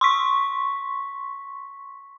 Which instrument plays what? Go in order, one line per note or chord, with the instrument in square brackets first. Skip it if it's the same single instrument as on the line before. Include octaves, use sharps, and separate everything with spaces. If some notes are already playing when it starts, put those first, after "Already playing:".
[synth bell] C6 C#6 B6